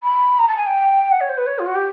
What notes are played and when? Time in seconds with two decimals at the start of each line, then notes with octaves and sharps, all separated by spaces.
0.03 B5
0.38 A#5
0.47 A5
0.57 G#5
0.66 G5
1.11 F#5
1.20 C#5
1.29 C5
1.37 B4
1.46 C#5
1.58 F4
1.66 F#4
1.75 G4